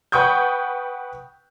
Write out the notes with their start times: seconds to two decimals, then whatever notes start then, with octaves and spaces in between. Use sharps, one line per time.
0.12 B4 F#5 G5 C#6 D#6 G6